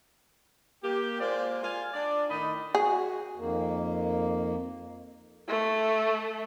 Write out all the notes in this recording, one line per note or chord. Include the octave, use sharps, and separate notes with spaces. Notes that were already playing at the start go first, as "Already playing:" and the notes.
A#3 G4
G#3 A#3 F4 C5 D5
F4 F5 G#5
D4 D5
A2 D#3 D#4 D#5 B5
F#4 G#4
F2 D#3 A#3
A3